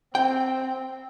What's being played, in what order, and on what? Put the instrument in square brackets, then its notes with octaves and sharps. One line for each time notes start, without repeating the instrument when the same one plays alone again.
[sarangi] C4 [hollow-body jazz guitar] G5